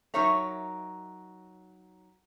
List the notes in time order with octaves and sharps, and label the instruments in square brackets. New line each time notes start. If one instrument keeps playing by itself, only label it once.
[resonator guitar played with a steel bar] F#3 D#4 A#4 C#5 E5 A#5